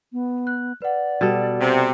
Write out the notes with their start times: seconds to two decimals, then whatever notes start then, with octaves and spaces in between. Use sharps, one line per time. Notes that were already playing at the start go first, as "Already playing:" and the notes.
0.13 B3
0.47 F#6
0.82 B4 D5 F#5
1.21 B2 G3 A4
1.61 C3